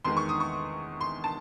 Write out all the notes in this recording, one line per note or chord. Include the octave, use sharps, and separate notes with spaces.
E2 D#3 G#3 C6
C#6
D#6
C#6
C6
A5